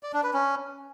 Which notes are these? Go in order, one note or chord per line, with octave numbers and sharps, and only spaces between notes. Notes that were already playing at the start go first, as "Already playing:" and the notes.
D5
D4
B4
C#4